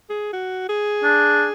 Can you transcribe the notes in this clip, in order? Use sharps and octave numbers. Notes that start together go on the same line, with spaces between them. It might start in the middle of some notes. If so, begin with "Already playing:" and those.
G#4
F#4
G#4
D4